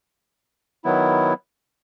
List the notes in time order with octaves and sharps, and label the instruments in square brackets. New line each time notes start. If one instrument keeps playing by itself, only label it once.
[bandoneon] D#3 F#3 B3 E4